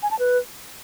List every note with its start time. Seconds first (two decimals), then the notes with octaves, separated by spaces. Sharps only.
0.03 G#5
0.11 A5
0.19 B4